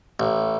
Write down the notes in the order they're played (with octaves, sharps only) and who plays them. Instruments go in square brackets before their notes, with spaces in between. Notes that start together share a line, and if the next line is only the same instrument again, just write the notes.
[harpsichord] A1